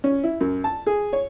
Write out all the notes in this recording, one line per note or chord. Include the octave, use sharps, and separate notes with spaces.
C#4
E4
F#2
A5
G#4
C#5